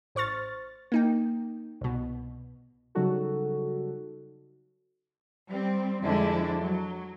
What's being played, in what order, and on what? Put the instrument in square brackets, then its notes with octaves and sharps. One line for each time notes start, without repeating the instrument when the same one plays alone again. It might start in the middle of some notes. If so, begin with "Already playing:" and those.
[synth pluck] A1 C5 C#6 F6 A6
A#3 D#4 G5
C2 B2
[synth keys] C#3 F#3 G3 D#4 F#4 A4
[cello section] G3 C4
F2 D3 G#3 D4 E4
F#3